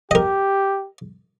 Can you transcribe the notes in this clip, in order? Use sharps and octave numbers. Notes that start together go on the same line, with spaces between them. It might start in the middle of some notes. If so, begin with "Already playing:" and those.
G4 A#4 D#5